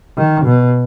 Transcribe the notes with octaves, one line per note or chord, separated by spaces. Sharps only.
D#3
B2